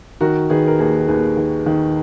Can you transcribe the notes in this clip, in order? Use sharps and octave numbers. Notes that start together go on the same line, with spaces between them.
D#3 F#4 A#4
D#3 G#4 B4
A#4
D#2 G#4
D#2 G#4 B4
D#3
D#3